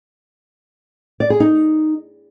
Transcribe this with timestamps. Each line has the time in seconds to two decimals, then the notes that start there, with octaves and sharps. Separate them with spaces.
1.20 D5
1.30 G#4
1.40 D#4